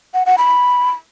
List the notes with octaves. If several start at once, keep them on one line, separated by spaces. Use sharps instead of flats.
F#5
F#5
B5